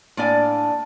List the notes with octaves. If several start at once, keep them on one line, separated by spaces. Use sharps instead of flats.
A2 A#3 D4 D5 G#5